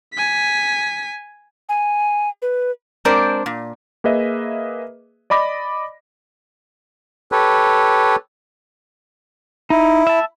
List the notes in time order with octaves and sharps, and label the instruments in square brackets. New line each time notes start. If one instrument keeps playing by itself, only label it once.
[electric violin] G#5 B6
[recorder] G#5
B4
[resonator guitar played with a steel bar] G#3 C4 D4 A#4 C5 D5
A#2
[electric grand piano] A#3 G#4 B4 D#5 E5
D5 D#5 B5 D6 A#6
[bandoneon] G4 A4 B4 C#5
[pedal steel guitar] D#4 [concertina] E4
[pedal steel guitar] E5 A5